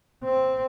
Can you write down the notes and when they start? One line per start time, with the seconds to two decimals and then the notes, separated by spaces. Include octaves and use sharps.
0.24 C4